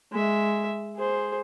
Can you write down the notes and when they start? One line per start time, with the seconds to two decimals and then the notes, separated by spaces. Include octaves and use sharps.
0.11 G#3 E5
0.96 G#4 C5